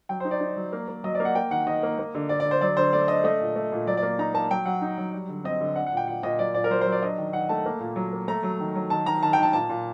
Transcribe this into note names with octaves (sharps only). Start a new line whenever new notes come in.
F#3 G5
C5
D#4
D5
D#4
F#3
A#3
A#3
F#3 D#5
D5
A#3
F#5
A#3 G5
D#3 F#5
D#3 D#5
A#3
A#3
D3
D3 D5
D5
D3
C5
F#3 D5
D3 C5
A3 D5
D4 D#5
A3 D#5
A#2
A3
A#2
F#3 D5
D5
A#3
D#4 A#5
A#3 A5
F#3 G5
F#3 F#5
D#4
F#3
G3
D3
C4 D#5
D3
D4 F#5
F#5
A#2 G5
A#2 F#5
A#2 D#5
F#3 D5
A#2 D5
A#4
F#3 C5
C5
F#3
D5
D4 D#5
D#3
D#3 F#5
A3 A5
A#3
A#2
F#3
A#3
A3 A#5
F#3
D#3
F#3
D#3 A5
D#3 A#5
D#3 A5
G5
D#3 A5
A#2 A5
A#2